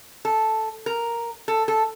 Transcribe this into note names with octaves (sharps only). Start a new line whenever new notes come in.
A4
A#4
A4
A4